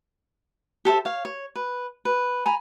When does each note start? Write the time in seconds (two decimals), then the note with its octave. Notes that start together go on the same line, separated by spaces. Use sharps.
0.85 G4 A4 C5 E5
1.05 C#5 F5
1.25 C#5
1.55 B4
2.05 B4
2.46 G#5 A#5 B5